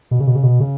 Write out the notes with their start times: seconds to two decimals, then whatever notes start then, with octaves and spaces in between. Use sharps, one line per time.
0.11 B2
0.20 C#3
0.27 B2
0.35 C#3
0.43 B2
0.60 C#3